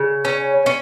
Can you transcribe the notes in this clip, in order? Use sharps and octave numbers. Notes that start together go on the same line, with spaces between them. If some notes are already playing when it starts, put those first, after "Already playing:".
Already playing: C#3
C#4
C#4